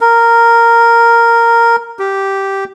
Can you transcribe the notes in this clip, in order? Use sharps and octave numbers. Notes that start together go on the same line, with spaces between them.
A#4
G4